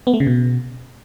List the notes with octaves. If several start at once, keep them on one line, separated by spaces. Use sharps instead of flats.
B3
A3
C#3
B2